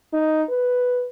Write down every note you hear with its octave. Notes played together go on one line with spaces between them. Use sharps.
D#4
B4